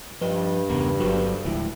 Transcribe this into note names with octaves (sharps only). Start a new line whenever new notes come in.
G2 F3 D#5
E2 C#3 B3 A#4
G1 F#3 F#4 A4 C5
D1 D2 F3 G#3 E4